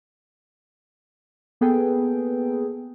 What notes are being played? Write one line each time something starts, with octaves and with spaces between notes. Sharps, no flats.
A#3 B3 G#4 A4 B4 G5